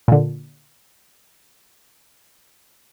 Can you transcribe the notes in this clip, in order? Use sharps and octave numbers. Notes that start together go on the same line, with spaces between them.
A#2 D3